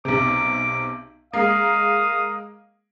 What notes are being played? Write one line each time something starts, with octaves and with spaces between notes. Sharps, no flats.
B1 C3 D6
G#3 A#3 F5 D#6